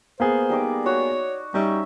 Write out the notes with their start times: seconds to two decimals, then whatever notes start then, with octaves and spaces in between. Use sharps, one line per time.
0.20 A#3 B3 G#4 C5
0.50 G3 D#4 D6
0.86 F#4 C#5
1.54 G3 C#4 D#4 E5